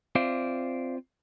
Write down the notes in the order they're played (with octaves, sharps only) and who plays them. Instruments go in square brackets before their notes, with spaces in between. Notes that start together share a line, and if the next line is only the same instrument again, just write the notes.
[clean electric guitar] C4 F4 C5 D5 E5 F5